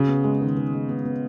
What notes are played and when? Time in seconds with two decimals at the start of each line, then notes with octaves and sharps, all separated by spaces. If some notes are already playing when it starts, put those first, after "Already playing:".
Already playing: C#3 F#4
0.08 B3
0.24 G#3
0.41 D#3
0.57 D#3
0.73 G#3
0.89 B3
1.05 B3